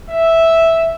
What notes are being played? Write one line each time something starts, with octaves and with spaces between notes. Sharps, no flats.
E5